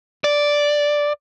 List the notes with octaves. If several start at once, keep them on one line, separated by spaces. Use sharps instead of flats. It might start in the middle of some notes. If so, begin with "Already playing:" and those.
D5